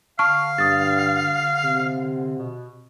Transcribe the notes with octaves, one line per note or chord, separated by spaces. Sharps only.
D3 F5 A5 C#6 F6
G2 D#6 A6
C3
B2